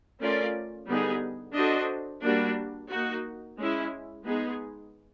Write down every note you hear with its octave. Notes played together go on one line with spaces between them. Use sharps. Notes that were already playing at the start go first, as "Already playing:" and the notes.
A3 C#4 F4 A#4 D5
D3 G3 B3 D#4 G#4
D4 F#4 A4 C5 D#5
G3 A#3 D4 F#4
A#3 D#4 F#4
G#3 C#4 E4
G#3 B3 D#4 G#4